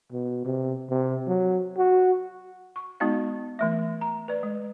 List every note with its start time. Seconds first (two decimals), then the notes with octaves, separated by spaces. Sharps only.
0.12 B2
0.45 C3
0.90 C3
1.27 F#3
1.78 F#4
2.76 C#6
3.00 G#3 B3 D#4 F#4 F5
3.59 E3 A3 E5
4.01 A#5
4.28 B4 D5
4.43 G#3